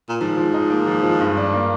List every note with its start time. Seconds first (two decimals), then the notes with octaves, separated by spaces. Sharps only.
0.09 A#2
0.21 G#2 F3
0.37 F3
0.54 D#4
0.70 A#3
0.87 F3
1.03 F3
1.21 G2
1.37 D4
1.53 A#3